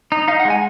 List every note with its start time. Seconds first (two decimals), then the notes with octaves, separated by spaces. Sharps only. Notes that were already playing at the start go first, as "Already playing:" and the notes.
0.12 D#4
0.28 D#4 F5
0.40 F#5
0.45 G#3
0.50 G#5